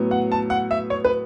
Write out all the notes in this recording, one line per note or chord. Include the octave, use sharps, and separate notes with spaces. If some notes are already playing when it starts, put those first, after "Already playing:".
Already playing: A2 F#3 B3
F#5
A5
F#5
E5
C#5
B4